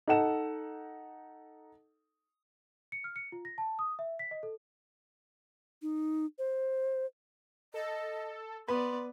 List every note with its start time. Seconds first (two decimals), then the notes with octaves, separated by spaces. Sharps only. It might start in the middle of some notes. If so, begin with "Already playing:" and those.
0.08 D#4 A4 F#5 E7
2.92 C#7
3.04 F6
3.16 C#7
3.32 F4
3.45 A#6
3.58 A5
3.79 D#6
3.99 E5
4.19 B6
4.31 D#5
4.43 A4
5.82 D#4
6.39 C5
7.74 A4 D#5
8.68 B3 B4 D5 C6